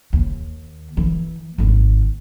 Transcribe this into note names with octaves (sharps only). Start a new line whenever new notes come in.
D#2
E3
G#1 D#2